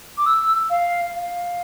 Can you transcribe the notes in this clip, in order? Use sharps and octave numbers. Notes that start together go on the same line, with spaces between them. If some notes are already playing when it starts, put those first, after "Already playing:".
D6
E6
F5
F5